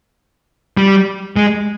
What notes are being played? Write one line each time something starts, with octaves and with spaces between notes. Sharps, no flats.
G3
G#3